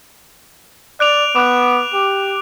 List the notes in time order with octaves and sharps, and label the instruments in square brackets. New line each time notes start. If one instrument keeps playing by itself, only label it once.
[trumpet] D5 [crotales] F#6 D7 F7
[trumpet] B3 [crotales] D6 F#6
[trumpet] G4